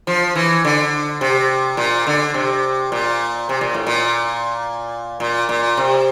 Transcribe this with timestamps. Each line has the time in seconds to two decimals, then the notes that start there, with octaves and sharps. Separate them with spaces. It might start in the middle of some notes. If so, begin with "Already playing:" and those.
0.07 F3
0.36 E3
0.65 D3
1.21 C3
1.77 A#2
2.07 D3
2.34 C3
2.92 A#2
3.49 C3
3.61 A#2
3.74 A2
3.87 A#2
5.20 A#2
5.49 A#2
5.77 C3